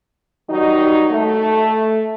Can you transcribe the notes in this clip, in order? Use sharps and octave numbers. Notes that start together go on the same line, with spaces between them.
D#3 F#3 G3 D#4
A3